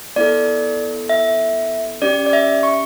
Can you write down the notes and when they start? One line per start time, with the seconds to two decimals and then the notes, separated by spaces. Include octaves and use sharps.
0.16 B3 E4 A4 D5
1.09 E5
2.02 C#4 G4 D5
2.26 D5
2.33 E5
2.63 C#6